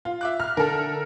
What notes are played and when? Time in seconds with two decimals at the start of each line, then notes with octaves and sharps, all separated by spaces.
0.05 F4
0.21 E5 D6 F#6
0.40 F6
0.57 D3 A4 A#4